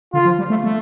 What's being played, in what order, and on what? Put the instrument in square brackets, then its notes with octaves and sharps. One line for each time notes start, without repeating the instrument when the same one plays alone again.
[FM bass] D3 [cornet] F4
[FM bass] F3
G3
A3
A3